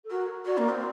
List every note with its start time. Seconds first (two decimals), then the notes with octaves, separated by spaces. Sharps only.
0.04 A4
0.10 F#4 A#4
0.45 F#4 D5
0.58 A#3
0.69 C4